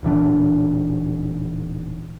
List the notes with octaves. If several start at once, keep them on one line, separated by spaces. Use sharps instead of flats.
D1 A#2 E3 D4